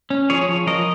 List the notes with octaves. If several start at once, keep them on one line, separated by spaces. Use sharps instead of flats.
C#4
F3 G#4 C#5
F3
F3 A#4 D#5